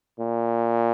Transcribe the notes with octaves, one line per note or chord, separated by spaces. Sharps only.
A#2